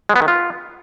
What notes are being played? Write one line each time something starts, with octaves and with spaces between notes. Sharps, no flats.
G#3
B3
D#3
F4